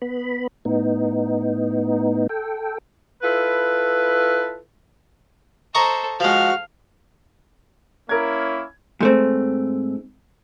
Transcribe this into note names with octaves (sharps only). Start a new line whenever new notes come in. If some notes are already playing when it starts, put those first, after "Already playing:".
B3 B5
A2 B3 D#4
A4 G5
E4 F4 A4 B4
A4 C5 D#5 A#5 C#6
F3 G#3 F#4 F5 F6
A#3 C#4 E4 A#4 G#6
G#2 A3 C4